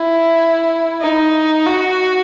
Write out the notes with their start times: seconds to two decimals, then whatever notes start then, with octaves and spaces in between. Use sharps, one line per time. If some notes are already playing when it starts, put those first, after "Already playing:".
Already playing: E4
1.01 D#4
1.66 F#4